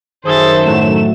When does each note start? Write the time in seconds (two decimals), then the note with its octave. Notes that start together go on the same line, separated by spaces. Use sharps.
0.25 F#2 D#3 G#4 A4 C5 E5 A6
0.65 A2 F#3 A3 E7